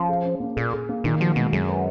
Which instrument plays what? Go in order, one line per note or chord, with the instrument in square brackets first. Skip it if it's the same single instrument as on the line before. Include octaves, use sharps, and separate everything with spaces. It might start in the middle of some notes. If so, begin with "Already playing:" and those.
Already playing: [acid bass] F3 [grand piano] C#4
[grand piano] G#4
C#4
A#3
[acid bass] A#2 [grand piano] G#4
[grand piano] G#4
A#3
[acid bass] A#2 [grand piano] D#3
[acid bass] F3 [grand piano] F#4
[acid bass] B2 [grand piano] G#3
[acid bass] F#2 [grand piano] G#4
[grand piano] B4